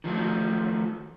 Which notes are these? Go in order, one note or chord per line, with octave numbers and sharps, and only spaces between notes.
D#3 F3 F#3 A3